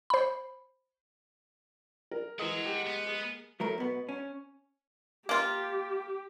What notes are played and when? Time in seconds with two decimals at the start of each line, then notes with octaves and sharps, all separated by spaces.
0.10 C5 B5
2.11 A#4
2.39 E3 G#3 F#5 A#5 D#6
2.66 G4
2.87 B3
3.06 G#4
3.60 F#3 A3 A#4
3.78 B2 B3
4.09 C#4
5.29 A#3 F4 G4